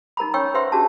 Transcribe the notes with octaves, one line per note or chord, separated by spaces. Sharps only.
D#4 A#4 A#5 B5
C#4 D#4 C#5 G5 C#6 E6
B4 C5 E5 F#5 C6 E6
C#4 D4 F#4 G#4 A5